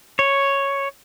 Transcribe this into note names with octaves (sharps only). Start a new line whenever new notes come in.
C#5